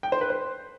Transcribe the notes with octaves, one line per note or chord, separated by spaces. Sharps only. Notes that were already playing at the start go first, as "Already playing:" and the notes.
G5
C5
B4
C5